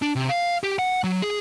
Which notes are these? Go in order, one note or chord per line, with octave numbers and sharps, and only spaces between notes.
D4
C3
F5
G4
F#5
F#3
G#4